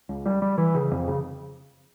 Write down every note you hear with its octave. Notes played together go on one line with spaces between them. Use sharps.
C#2
G3
G3
E3
C#3
F2
C#3